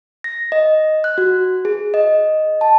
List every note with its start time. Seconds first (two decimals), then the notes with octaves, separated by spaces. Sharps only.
0.24 A#6
0.52 D#5
1.04 F#6
1.18 F#4
1.65 G#4
1.94 D#5
2.61 A5